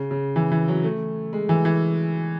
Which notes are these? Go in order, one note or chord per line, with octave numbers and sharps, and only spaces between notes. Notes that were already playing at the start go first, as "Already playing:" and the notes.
Already playing: C#3
C#3
E3
E3
F#3
A3
G#3
E3
E3